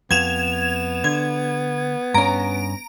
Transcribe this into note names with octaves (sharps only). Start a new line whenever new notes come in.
F2 B3 G#6 E7 F7
D3 G#6
G2 C#4 A#5 D7